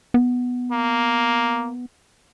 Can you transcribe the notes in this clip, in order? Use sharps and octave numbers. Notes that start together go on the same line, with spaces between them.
B3
A#3